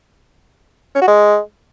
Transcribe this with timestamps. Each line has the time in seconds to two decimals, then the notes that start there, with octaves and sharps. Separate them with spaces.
0.95 C#4
1.01 F#4
1.08 G#3